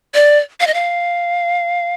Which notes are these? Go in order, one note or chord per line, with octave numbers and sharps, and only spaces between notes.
D5
F5
D#5
F5